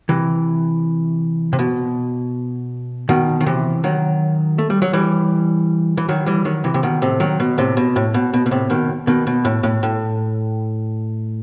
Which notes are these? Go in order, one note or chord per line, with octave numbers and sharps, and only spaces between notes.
C3 E3
C3
B2
B2 D#3
D#3
C3 E3
D#3 F#3
A3
G3
F#3
E3 G3
E3
D#3 F#3
E3 G3
D#3 F#3
C3 E3
C3
B2 D#3
A2 C3
D#3 F#3
B2
A2 C3
B2
A2
B2
B2
B2
A2 C3
B2 D#3
B2 D#3
B2
A2
A2
A2